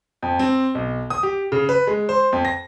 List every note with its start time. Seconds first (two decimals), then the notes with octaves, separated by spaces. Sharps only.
0.22 F2
0.39 C4
0.75 B1
1.10 D#6
1.23 G4
1.52 C#3
1.69 B4
1.87 G#3
2.09 C5
2.33 F2
2.45 A#6